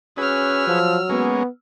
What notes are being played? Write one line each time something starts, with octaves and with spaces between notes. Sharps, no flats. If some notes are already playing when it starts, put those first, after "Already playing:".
C#4 F#4 G#4 B4 E6 F6
F3 F#3
G#3 A#3 B3 C#4